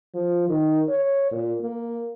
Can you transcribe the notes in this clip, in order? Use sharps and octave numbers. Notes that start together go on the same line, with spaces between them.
F3
D#3
C#5
A#2
A#3